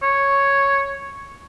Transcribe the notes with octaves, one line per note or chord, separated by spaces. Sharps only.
C#5